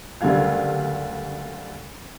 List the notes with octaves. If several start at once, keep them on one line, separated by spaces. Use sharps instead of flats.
F#1 D2 D3 G3 F5 G#6